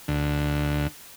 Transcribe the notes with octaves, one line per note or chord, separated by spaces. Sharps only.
D2